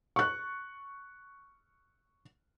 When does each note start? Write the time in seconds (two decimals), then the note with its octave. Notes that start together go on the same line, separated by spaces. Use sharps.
0.16 C#6 F#6